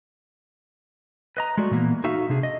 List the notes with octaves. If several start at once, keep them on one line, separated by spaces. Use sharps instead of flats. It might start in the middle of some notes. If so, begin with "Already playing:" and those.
B4 D#5 A#5
G#3 A3 F#4 D5
A#2 E3 A#3 B3
D#4 F#4 A4 E5 F5
C3 D4 G#4
D#5